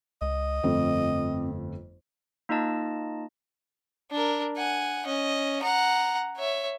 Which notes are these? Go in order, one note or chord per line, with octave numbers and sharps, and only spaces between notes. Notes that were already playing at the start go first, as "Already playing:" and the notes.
C#2 D#5
G1 F2 A3 C4
A#3 D#4 F4 D#5 A5
D4 A#4
F#5 G#5
C#4 D#5
F#5 A#5
C#5 E5